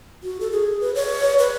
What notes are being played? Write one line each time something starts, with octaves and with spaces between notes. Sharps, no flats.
F#4
A4
G#4
B4
C#5
B4